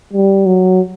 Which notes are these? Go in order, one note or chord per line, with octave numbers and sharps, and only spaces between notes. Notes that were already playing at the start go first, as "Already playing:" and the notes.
G3
F#3